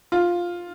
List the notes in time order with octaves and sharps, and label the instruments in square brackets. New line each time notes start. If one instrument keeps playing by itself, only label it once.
[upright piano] F4